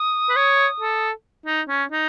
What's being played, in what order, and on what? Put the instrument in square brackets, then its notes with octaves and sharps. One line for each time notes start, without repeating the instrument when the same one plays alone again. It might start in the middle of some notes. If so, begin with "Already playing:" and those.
Already playing: [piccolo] D#6
[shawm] B4
C#5
A4
D#4
C#4
D#4